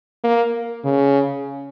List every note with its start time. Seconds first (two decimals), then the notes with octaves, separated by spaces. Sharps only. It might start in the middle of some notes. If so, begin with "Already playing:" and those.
0.24 A#3
0.84 C#3